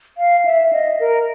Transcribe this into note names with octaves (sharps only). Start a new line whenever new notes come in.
F5
E5
D#5
A#4